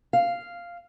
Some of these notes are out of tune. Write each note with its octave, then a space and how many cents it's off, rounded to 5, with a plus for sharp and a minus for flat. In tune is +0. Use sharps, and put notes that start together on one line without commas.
F5 -5